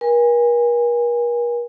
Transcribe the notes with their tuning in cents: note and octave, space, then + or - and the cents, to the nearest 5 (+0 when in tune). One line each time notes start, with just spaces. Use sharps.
A#4 +45 G#5 -25